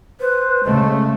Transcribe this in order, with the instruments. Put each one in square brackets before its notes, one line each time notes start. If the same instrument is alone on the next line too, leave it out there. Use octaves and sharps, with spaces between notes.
[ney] B4 [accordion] C5
[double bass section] C#3 A3 [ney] G#3